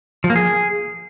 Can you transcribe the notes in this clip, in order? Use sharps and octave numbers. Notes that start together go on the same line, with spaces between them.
F3
A#3
G#4